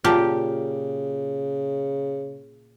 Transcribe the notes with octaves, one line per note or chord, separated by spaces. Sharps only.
A#2 C#3 F4 G4 A5